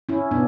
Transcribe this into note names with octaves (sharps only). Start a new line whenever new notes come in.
C#4 E4
B2 B3 D4